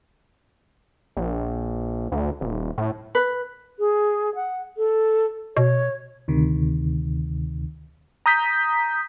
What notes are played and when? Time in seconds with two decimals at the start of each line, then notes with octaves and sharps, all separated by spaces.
1.17 A#1
2.12 D2
2.41 D#1
2.78 A2
3.15 B4
3.79 G#4
4.35 F#5
4.77 A4
5.57 B2 C#5
6.28 D2 C3 D#3
8.26 A#5 D#6 G6 B6